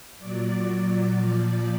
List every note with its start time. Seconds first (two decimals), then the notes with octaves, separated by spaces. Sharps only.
0.18 A#2 F#3 D5
0.66 D5
1.14 A#2 F3